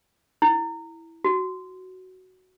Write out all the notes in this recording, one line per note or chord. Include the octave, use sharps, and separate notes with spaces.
E4
F#4